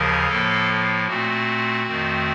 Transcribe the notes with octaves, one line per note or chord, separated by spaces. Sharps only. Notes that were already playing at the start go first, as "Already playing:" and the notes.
Already playing: D#2 C#3 F3 A#4
A2 F3 A#3 A4
A#2 A3 C4 F#4
F2 D#3 A3 C4